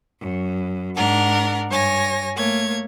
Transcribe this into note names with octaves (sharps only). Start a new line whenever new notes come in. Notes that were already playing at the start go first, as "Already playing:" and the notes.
F#2
G#2 D4 A#4 F#5
G2 C#5 G#5 A#6
A3 A#3 C#5 G#6